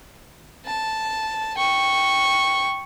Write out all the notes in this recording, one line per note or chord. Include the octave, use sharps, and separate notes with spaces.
A5
G5 C#6